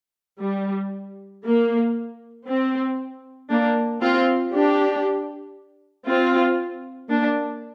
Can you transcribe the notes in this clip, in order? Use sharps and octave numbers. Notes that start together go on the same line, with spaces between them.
G3
A#3
C4
A#3 D4
C4 F4
D4 G4
C4 F4
A#3 D4